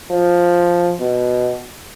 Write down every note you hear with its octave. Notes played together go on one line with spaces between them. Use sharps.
F3
B2